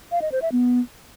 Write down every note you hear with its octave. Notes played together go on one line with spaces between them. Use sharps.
F5
D#5
C5
E5
B3